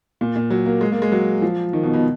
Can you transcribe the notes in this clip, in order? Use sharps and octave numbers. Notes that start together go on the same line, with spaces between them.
A#2
A#2
F#3
A#3
G#3
A#3
G#3
F#3
F3
D#3
B2
B2